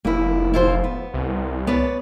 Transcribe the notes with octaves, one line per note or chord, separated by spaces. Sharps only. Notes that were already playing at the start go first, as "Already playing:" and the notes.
F1 A#3 E4
E4 F4 C5
B3
C2
B3 C#5 D5